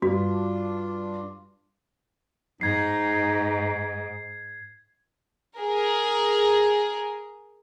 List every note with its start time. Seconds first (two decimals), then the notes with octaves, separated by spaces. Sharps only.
0.02 G2 D4 F4 F#4
2.61 G#2 D#4 G#6 C7
5.58 G#4 A#4